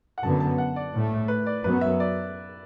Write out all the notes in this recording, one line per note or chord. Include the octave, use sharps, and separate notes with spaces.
F#5
F#2 D3 B3 A5
A5
F#5
D5
A2 A3
B4
D5
F#2 F#3 B3 B4
E5
D5